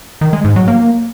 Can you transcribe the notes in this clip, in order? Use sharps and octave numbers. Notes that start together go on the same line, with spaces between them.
D#3
G#3
G#2
F#3
A#3